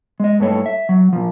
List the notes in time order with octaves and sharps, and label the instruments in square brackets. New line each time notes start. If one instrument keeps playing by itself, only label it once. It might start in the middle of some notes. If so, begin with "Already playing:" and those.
[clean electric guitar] G#3 D#5
G2 A3 C#5
E5
F#3
A#2 F3